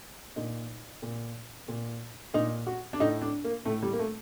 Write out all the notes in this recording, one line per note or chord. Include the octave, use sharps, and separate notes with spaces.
A#2 D#4
A#2
A#2
A#2 D#4
F#4
D4
A2 D#4
D4
A#3
A2 A3
G3
A#3
A3